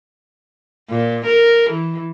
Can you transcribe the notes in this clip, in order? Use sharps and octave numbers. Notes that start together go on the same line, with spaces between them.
A#2
A#4
E3